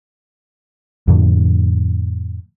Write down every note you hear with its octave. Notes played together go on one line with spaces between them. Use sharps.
F2 A2 D3 F3